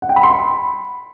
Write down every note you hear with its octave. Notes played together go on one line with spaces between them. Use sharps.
F#5
G5
B5
C6
B5